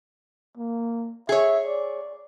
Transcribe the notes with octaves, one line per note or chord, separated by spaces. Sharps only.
A#3
G#4 C#5 E5
D5